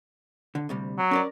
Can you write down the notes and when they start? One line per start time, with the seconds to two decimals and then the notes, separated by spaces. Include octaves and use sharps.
0.55 D3
0.69 D2 C3 G3
0.98 F#3
1.11 C#4 A#4 D5